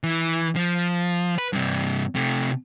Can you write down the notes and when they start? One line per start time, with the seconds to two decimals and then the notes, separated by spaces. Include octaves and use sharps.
0.04 E3
0.55 F3
1.38 B4
1.53 G2 C3
2.15 C3 A3